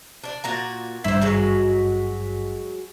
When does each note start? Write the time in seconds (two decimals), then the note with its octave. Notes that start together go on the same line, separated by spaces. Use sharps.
0.24 D4 D5
0.44 A#2 F#4 A#5
1.04 G#1 G2 E4 C5 B6
1.22 F#3 G#3 F#4